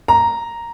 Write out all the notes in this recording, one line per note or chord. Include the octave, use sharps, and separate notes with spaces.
A#5